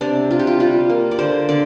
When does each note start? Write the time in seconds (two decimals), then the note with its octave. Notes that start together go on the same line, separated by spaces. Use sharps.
0.01 C3 D4
0.31 C3 F4
0.39 G4
0.47 F4
0.60 G3 F4
0.89 A#3
1.11 D5
1.19 D3 C5
1.49 D3 D5